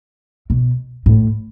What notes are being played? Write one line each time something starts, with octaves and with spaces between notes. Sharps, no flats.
B2
A2